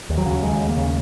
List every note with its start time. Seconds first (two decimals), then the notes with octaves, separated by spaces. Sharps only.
0.10 D#2
0.18 F#3
0.26 C#3
0.43 D#2 G#3
0.60 D#2
0.68 A#3
0.77 C#3